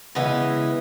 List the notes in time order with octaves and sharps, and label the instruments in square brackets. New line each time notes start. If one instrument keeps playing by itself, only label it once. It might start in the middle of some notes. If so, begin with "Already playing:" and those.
[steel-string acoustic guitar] C#3 E3 G#3 [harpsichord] B3